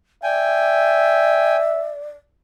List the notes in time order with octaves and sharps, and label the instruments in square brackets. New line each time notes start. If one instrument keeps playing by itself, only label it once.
[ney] D5 [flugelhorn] E5 [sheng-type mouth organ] G5 G#5